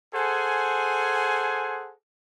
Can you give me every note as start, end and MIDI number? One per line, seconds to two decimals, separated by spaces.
0.14 1.92 68
0.14 1.92 69
0.14 1.92 72
0.14 1.92 78
0.14 1.92 80